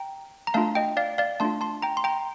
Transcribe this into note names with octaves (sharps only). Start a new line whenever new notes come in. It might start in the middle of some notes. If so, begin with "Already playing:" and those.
Already playing: G5 A#5
A#5
A3 D4 F4 F5 A5
D#5 G5
D5 F5
D5 F5
A3 D4 F4 A5 C6
A5 C6
G5 A#5
C6
G5 A#5